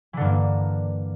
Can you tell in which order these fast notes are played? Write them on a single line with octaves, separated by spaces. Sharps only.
E3 D3 G2 A#3